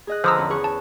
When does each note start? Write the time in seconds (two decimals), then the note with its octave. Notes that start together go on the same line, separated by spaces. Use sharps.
0.07 G#4 D#5 F#6
0.24 D3 F3 B4 C5 A#5 D#6 E6
0.37 E2 C#4 B4
0.50 G#4 B4 C#6
0.64 A5